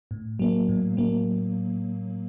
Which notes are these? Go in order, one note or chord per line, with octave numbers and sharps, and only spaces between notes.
A2
F#3 A#3
A2
F#3 A#3